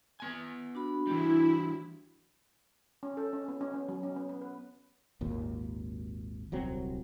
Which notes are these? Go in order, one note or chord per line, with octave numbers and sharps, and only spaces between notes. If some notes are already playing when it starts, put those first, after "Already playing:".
B3 G#5
D4 F#4 B5
E3 G3 E4
C#4
A4
C#4
B3
C#4
B3
F#3
C#4
B3
B3
B4
G#1 D#2 A#2
D#1 C2 F#3 C4